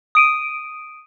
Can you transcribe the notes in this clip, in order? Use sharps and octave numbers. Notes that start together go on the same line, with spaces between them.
D#6 D7 D#7